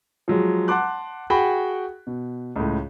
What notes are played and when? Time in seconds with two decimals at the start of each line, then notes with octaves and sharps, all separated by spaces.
0.28 F3 F#3 G#3
0.68 F#5 A5 C6 D6 F#6
1.30 F#4 G#4 F#5 G5 B5
2.07 B2
2.56 C#2 A2